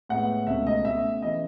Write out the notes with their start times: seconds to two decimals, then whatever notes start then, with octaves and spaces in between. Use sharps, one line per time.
0.09 A2 G#3 B3 F#5
0.47 C#2 B2 A3 C#4 E5
0.67 D#5
0.85 B2 A3 C#4 E5
1.22 C#3 E3 D#5